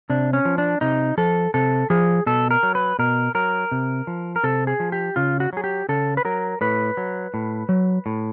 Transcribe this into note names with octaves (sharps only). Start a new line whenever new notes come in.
C3 D4
C#4
F3
D4
C3 D#4
F3 A4
C3 A4
F3 G#4
B2 A4
A#4
F#3
B4
B2 A#4
F#3 A#4
C3
F3
A#4
C3 A4
G#4
F3
G4
C#3 F4
F#4
F#3 G#4
G4
C#3 A4
B4
F#3 A#4
A2 B4
F#3
A2
F#3
A2